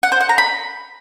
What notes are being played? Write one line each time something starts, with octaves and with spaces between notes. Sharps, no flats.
F#5
C5
F#5
A#5
B5